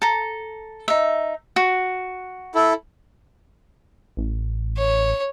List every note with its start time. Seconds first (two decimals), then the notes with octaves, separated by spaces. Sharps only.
0.02 A4 A#5
0.88 D#4 E5
1.56 F#4
2.55 E4 A4
4.17 A1
4.77 C#5